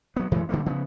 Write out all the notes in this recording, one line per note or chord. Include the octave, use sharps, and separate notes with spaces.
F#3 B3
F#2 E3 G#3 A3
D3 G3 A3 A#3
C#3 F3 B3